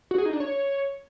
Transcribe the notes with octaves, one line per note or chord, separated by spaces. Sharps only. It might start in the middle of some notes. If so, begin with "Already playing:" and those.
F#4
G#4
D#4
D4
C#5